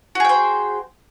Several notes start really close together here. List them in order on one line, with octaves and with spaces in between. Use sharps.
F#4 G#4 G5 C5